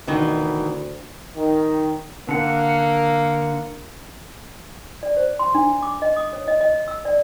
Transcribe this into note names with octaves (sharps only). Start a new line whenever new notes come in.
D2 B2 D#3 E3
D#3
D3 A#3 F#5
D5
C5
C6
D4
D6
D#5
D#6
C#5
D#5
D#5
E6
D5